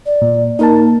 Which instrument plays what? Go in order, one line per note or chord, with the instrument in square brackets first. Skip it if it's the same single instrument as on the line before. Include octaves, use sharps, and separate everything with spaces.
[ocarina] D5
[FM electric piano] A#2
[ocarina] A#3 [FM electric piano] D#4 A#4 A5